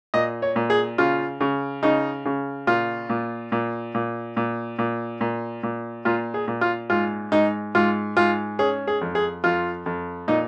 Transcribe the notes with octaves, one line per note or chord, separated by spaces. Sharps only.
A#2 D#5
C#5
A#2
G#4
C#3 F4
C#3
C#3 D#4
C#3
A#2 F4
A#2
A#2
A#2
A#2
A#2
A#2
A#2
A#2 F4
G#4
A#2
F4
G#2 F4
G#2 D#4
G#2 F4
G#2 F4
C#4 G#4
G#4
F2
G#4
F2 F4
F2
A#2 D#4